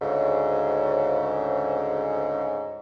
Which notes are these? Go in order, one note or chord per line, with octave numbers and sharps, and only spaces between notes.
D2 G#2 C#3